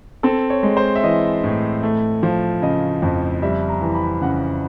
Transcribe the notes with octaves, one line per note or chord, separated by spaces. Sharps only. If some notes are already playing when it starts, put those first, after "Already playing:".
C4 A4
C#5
G#3
C5
E5
E3 D#5
A2
A3
F3
C#3 D#5
F2
G3 E5
A#5
E3
B5
C#3 F#5